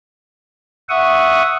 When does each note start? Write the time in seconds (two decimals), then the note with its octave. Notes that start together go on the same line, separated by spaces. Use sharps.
0.89 E5 F#5 C#6 D#6